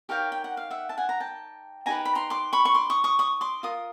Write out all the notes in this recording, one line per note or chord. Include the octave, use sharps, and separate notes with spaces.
D#4 G4 A#4 C#5 F5 G5
G5
F#5
F5
E5 F#5
A5
F#5 G#5
A#5
G5 A5
D#4 G4 B4 G#5 A#5
B5
A#5 C6
C6 D6
B5 C#6
C#6
C6 D6
C#6 D#6
C#6 D#6
C#6 D#6
C6 D6
F4 A#4 D#6